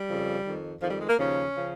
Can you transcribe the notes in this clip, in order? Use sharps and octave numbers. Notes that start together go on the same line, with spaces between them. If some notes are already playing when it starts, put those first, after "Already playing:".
Already playing: G3
F2 C#3 F3
F2 D#3
F2 D#3 F3
G3
G#3
A#3
D#2 C#3 F3 C#4
C#3 F3